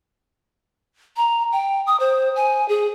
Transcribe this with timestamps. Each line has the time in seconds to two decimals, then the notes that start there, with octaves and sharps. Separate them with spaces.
1.17 A#5
1.52 G5
1.87 D#6
2.00 C5
2.36 G#5
2.69 G#4